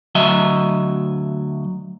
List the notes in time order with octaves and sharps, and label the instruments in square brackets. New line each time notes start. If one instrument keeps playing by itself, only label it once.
[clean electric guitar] D2 F#3 D#5 E5